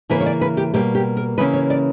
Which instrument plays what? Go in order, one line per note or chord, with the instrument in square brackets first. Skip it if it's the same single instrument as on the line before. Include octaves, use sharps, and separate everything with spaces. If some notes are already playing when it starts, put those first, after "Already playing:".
[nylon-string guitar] C#3 E3 A#3 B4
C#5
D5
B4
G4
B2 G3 A#3 G4
G4
A#4
C#3 E3 A#3 C#4 B4
C#5
D5